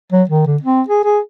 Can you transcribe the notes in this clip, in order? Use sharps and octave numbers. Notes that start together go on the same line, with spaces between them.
F#3
D#3
D3
C4
G#4
G#4